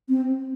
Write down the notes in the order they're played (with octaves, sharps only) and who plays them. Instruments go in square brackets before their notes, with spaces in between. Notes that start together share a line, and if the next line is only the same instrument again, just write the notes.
[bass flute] C4